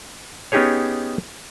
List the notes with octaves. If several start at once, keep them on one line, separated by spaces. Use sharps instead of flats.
B3 C#4 D#4 G4 G#4 C#5